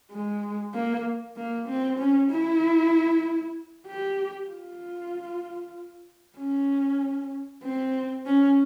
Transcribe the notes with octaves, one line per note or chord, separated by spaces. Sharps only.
G#3
A#3
A#3
C4
C#4
E4
G4
F4
C#4
C4
C#4